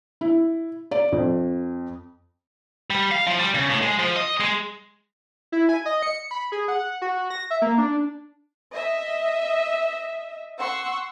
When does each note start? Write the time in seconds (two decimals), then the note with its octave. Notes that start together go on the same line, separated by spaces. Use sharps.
0.21 E4
0.91 D5
1.12 F2
2.90 G3
3.11 F5
3.27 F3
3.39 G3
3.54 C#3
3.70 A2
3.82 G#3
3.99 F3
4.16 D#5
4.40 G#3
5.52 E4
5.69 G#5
5.86 D#5
6.02 C#7
6.31 B5
6.52 G#4
6.68 F#5
7.02 F#4
7.30 A#6
7.50 E5
7.62 A#3
7.78 D4
8.73 D#5 E5
10.58 F#5 C6 C#6 E6